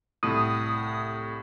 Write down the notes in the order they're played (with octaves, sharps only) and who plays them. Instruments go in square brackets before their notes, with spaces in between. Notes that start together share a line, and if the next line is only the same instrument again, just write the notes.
[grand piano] C2 A2 [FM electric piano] D#6